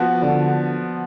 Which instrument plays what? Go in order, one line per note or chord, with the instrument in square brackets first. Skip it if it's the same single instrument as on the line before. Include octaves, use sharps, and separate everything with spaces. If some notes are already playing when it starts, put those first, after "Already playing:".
Already playing: [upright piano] F3 B3 F#4
[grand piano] D3